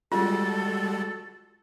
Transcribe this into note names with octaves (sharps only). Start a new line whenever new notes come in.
G3 G#3 F4 F#4 A4